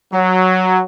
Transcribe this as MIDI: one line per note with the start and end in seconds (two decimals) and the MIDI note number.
0.13 0.82 54